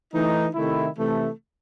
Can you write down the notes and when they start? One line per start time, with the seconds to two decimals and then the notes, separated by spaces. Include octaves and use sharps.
0.13 E3 A3 D#4
0.54 C3 D#3 A3 E4
0.96 C3 E3 A3